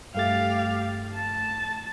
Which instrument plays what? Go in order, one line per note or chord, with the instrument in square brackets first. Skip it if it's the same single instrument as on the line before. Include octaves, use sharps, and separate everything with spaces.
[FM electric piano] G2 A3 A6 [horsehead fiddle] G4 F5
[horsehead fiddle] A5